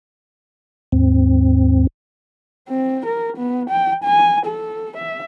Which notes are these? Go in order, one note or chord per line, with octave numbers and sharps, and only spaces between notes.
D#2 G#2 C4
C4
A#4
B3
G5
G#5
A4
E5